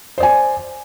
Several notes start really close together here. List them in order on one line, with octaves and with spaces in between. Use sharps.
C5 D5 G#5